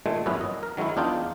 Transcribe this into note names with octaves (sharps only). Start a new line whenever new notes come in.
A#2 D#3 G#3 A3
G#1 F#2 B3 C#4 E4 B4
D#5
A#4
D#3 F#3 G#3 C#4 E4
E2 D4 D#4 F4 G5